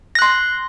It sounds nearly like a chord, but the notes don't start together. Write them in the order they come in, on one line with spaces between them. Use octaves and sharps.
A#6 F#6 C6